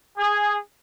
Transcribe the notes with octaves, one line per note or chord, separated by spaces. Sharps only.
G#4